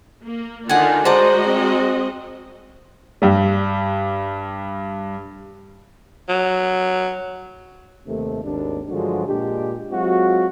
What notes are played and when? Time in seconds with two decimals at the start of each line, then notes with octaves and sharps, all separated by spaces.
0.23 A#3
0.69 D3 D#3 F4 D5 F#5 G#5
1.05 G#3 F#4 C5 D5 D#5 A5 A#5
1.47 C4
3.22 G2 G3
6.29 F#3
8.07 D#2 C3 D#3 A3
8.44 G#1 D#2 D4
8.90 G2 D3 F3 F#3 G#3 F#4
9.27 A#2 G#3 D4 G4
9.91 F#3 G#3 C4 F4 F#4